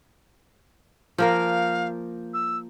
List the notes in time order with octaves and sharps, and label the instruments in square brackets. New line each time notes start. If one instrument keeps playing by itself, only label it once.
[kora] F3 A#3 A#4 [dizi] F5
[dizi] E6